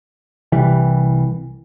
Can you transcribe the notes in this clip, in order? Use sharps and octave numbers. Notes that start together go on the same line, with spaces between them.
C2 E3 G3